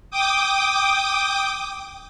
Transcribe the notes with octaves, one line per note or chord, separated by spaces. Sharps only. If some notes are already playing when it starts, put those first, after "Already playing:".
G5 D6 D#6